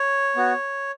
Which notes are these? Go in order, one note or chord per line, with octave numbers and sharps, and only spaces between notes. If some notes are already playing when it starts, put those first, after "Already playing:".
Already playing: C#5
B3 F#4